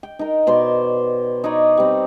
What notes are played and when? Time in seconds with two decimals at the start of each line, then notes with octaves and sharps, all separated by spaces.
0.03 G5
0.19 D#4 A#4
0.47 B2 C5 D5 C6
1.44 D#4 B4 C#5 D5
1.77 G3 C4